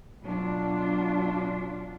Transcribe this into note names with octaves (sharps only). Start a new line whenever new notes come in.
B2 F#3 D4 F4